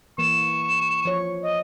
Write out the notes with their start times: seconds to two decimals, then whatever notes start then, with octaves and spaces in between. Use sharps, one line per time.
0.18 E3 A#3 C#6 E7
1.05 F3 C#5
1.42 D#5